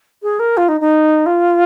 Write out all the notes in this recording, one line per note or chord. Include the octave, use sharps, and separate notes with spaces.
G#4
A#4
F4
D#4
D#4
F4